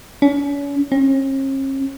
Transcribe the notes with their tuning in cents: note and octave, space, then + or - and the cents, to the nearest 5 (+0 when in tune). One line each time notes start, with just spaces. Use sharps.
C#4 +40
C#4 -45